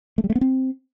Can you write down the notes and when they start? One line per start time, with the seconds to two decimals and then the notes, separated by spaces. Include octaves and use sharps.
0.18 A3
0.24 G3
0.30 A3
0.35 B3
0.41 C4